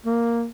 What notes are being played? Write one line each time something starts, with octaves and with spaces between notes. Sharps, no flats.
A#3